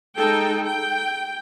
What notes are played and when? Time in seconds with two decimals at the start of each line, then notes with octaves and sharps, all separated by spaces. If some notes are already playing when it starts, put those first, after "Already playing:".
0.16 G#3 D#4 A4 G5
0.64 G5